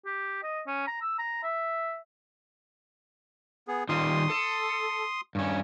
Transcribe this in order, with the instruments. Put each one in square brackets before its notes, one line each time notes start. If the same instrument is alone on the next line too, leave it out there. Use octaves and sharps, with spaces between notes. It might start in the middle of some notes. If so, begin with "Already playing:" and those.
[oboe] G4
D#5
C#4
A#5
E6
A#5
E5
[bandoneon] B3 G#4
[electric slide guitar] D#3 G3 F4 [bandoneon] C6 D#6
[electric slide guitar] A4
G2 C#4